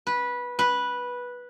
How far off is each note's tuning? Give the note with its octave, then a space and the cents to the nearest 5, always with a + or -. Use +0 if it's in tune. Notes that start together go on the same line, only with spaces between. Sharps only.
B4 -15
B4 -10